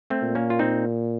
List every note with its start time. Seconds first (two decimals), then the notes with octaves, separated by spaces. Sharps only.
0.10 A3 C4
0.23 A#2
0.35 A#3 C#4
0.50 F4
0.59 C4 D#4